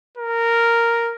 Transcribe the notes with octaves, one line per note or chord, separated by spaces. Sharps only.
A#4